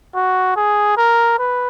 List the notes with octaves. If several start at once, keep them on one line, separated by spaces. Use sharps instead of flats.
F#4
G#4
A#4
B4